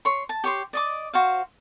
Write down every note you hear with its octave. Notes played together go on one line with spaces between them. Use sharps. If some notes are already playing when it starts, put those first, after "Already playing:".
C#5 C6
A5
G4 C#5 C6
D5 D#5 D6
F#4 C5 F5